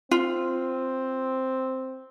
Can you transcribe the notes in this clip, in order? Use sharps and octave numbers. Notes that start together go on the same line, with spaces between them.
C4 F4